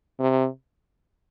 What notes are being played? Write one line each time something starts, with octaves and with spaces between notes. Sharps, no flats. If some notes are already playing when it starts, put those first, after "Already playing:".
C3